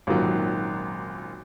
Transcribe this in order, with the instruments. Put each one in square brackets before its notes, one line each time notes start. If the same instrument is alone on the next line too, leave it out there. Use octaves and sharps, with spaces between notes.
[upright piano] G#1 F#2 A#2 D#3 F#3